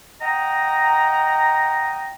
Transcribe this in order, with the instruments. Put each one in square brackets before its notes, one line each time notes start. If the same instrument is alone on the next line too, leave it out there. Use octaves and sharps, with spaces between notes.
[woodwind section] D#5 F#5 G5 A#5